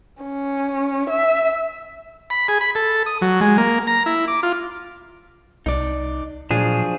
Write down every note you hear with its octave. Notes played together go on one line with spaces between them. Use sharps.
C#4
E5
B5
G#4
B5
A4
D#6
F#3
G#3
A#3
A#5
E4
D6
F4
C2 D#4 D5
A#2 F3 F#3 D4 G#4